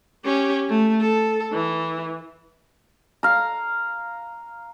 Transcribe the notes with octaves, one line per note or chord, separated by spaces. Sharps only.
C#4 G4
A3
A4
E3
F5 A#5